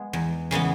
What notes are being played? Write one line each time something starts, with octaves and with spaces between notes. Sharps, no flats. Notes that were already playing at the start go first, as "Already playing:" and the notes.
Already playing: G#3 B3
E2
C#3 E3 G#3 B3